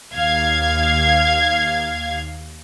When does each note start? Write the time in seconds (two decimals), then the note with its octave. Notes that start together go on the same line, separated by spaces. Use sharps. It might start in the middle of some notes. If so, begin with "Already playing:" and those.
0.14 D#2 F5 G#6